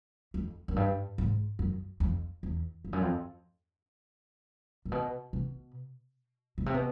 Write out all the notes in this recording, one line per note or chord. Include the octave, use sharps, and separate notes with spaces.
F2
F#2
G2
G#2
F#2
F2
E2
F2
F#2
F2
A#2
B2
B2
B2
C3
B2